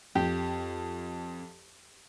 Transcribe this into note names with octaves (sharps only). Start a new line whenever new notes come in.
F2 G4